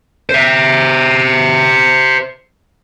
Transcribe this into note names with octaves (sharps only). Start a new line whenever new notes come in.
C5 E5